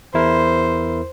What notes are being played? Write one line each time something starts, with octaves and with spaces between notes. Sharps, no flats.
E2 E4 A#4 C5